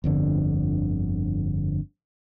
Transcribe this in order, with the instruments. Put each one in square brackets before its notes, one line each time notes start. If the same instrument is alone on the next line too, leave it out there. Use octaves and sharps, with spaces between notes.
[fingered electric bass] G1 F2 D3